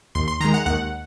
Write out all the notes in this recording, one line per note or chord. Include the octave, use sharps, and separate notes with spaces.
D#2 C6
C6
D#3 G#3 A#5
F#5
D#2 F#5